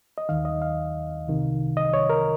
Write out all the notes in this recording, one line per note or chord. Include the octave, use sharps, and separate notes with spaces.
D#5
D#2 D#3 F5
D#5
F5
C2 C3 D#3
D#5
C#5
A#4